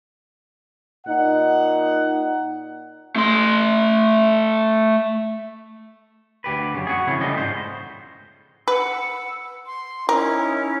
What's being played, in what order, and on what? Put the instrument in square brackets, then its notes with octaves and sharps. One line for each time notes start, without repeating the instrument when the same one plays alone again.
[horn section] A#2 D#4 F#5
[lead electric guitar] A3 C6
[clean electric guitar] D2 G4 B4
F#2 C#3
F#4 G#4
C#3 F3 C#4 E4 G#4
C#3 F3 G3 A3 D#5
G#2 C5
[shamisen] B4 [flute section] F#5 E6
[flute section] C6
[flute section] C#4 D#4 E4 [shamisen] A#4